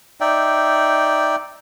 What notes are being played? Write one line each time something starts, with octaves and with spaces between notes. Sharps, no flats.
D#4 D5 E5 G5